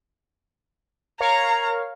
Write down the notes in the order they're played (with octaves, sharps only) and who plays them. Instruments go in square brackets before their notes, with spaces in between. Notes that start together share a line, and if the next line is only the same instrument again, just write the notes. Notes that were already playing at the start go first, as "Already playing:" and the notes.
[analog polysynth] A#4 C#5 F5 [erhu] A#5